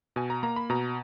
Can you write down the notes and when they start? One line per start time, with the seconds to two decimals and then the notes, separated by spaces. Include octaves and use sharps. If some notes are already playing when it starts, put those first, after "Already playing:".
0.16 B2 G#5
0.30 A#5
0.43 A#3 A#5
0.56 B5
0.70 B2 A#5